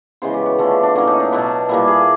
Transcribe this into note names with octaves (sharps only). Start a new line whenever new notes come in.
C#3 E3 G#3 B3 C5
G4
F#4
D3 F3 A3 C#4
D4
D4
A2 F#3 A#3 C#4
D#4
D4
B2 F#3 B3
A#2 G3 A#3 E4
G#4